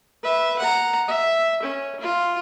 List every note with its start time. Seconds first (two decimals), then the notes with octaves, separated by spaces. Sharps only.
0.23 B4 E5
0.59 F#5 A#5
1.08 E5
1.63 C#4
2.00 F4